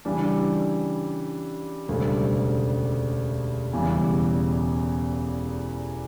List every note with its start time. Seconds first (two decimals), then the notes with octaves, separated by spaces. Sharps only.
0.05 C#3 E3 G3 D4
1.88 E1 D2 C#3 G3
3.73 E1 E2 C#3 E3 G3